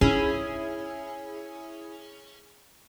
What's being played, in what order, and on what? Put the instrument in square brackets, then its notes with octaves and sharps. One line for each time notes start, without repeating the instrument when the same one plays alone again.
[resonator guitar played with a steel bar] C#4 [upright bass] D#4 [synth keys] E4 G#4